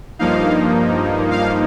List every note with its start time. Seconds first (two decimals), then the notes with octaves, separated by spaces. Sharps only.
0.19 G2 F3 A#3 D#4 F5
1.31 F5